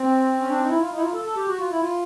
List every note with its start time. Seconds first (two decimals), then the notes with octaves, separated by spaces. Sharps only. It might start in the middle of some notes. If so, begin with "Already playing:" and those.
Already playing: C4
0.40 C#4
0.50 D4
0.60 D#4
0.69 E4
0.80 F4
0.91 D#4
0.97 E4
1.02 F4
1.14 A4
1.25 A4
1.36 G4
1.48 F#4
1.59 F4
1.71 E4
1.81 F4